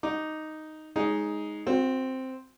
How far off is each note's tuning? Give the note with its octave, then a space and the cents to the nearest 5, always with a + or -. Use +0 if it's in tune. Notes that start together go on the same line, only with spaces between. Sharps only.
D#4 +0 D6 +0
G#3 +5 D#4 +10 C#5 +35
C4 +0 F#4 -35